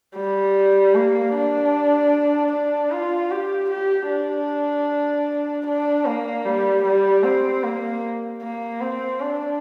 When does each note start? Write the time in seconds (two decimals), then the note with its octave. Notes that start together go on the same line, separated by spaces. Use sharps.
0.16 G3
0.95 A#3
1.34 D4
2.52 D4
2.92 F4
3.31 G4
3.70 G4
4.10 D4
5.66 D4
6.06 A#3
6.45 G3
6.84 G3
7.24 C4
7.64 A#3
8.42 A#3
8.81 C4
9.21 D4